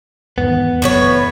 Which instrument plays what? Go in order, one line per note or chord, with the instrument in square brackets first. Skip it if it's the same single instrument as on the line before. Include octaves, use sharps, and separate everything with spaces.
[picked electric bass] E2 G#2 D#3 [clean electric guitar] B3
[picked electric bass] F#1 E2 F#3 [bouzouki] A2 B4 C#5